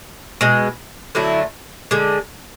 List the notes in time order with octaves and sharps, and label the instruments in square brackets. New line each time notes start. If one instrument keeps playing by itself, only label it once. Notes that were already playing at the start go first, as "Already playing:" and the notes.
[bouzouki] B2 G#3
D3 F#3 A3 E4
D3 G#3